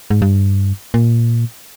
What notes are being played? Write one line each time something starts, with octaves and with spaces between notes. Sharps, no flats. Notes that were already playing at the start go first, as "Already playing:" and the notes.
G#2
G2
A#2